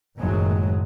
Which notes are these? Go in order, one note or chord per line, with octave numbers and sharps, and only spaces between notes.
F#1 D#2 A2 F#3 G#3